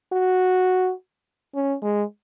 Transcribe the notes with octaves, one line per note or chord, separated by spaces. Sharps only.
F#4
C#4
G#3